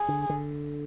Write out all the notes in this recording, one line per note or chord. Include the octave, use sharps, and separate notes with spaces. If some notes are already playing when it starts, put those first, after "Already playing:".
Already playing: G#4
D3
D3